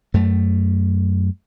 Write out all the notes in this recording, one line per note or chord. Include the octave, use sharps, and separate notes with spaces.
F#2 A3